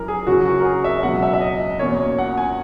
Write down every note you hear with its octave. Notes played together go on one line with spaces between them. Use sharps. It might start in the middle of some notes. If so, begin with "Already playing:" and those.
Already playing: F#2 E3 A#4
G#4
F#2 C#3 F#3 C#4 F#4
F#4
A#4
G#4
E5
C#2 B2 F#3 F#5
E5
E5
D#5
E2 B2 A#3 C#4 C#5
F#5
G#5